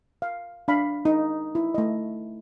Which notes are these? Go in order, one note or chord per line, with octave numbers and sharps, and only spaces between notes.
F5
D4 F5 B5
D#4
E4
A3 D#5